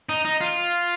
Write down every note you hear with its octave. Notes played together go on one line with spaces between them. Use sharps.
D#4
D#4
F4